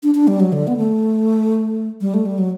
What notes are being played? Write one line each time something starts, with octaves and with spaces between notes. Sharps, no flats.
D4
D4
G3
F#3
D3
B3
A3
G3
A3
G3
F#3